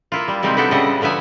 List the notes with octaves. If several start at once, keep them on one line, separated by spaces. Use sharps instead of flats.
A#3 E4 F4
G3
C3 G3 G#3 C4 D#4 E4
B3 C4 D4 E4 F#4 A4
A2 C#3 G3 E4 D#5 F#5
D3 F3 B3 E5 G#5